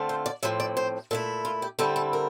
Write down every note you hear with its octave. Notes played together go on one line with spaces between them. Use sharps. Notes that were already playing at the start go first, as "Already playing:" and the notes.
Already playing: D3 A3 C4 F4
C5
D5
A2 F3 C4 E5
D5
C5
A#2 A3 E4 A4
F4
G4
D3 G3 C4 E4 A4
A4
A#4